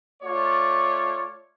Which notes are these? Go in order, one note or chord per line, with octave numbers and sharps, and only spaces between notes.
A3 F4 C#5 D5